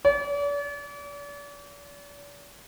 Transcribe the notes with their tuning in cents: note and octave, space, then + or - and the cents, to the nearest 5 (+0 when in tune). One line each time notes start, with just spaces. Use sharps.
D5 -40